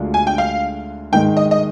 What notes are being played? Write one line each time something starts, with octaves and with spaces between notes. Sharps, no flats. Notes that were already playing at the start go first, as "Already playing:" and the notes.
Already playing: D2 D3 G#3 D4 F4
G#5
G5
F5
G#2 D#3 G#3 D#4 G5
D#5
D#5